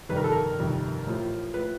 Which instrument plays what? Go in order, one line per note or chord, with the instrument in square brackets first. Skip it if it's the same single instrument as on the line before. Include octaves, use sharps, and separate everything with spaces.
[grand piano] G1 F2 C3 D#3 G3 B4
A#4
A4
A#4
G1 F2 C3 D#3 G3
A1 A2 F3
A2 F3 B4